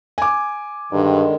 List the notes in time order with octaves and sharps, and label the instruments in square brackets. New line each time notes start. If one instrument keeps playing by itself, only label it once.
[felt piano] G#5 D6
[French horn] G2 [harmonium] D3 D#3 G#3